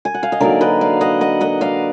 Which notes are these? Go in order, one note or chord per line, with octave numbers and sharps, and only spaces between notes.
G#5
F#5
F5
D#5
D3 F#3 A#3 D#4 A#4 D5
B4 D#5
D5 F5
D#5 F#5
D#5 F#5
B4 D#5
D5 F5